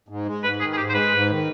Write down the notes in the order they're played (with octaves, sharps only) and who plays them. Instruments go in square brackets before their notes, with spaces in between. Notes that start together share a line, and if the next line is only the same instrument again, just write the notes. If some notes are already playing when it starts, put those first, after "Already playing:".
[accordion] G#2
G#3
[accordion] G#2 [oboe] B4
[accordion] D#3 [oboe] G#4
[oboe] G#4
[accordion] G#2 [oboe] G4
[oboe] C5
[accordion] G#3 [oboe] B4
[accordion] G#2
D#3